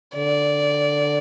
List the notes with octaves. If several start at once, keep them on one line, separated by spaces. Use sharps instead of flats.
D3 D5